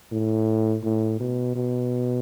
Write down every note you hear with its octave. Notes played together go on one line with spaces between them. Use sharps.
A2
A2
B2
B2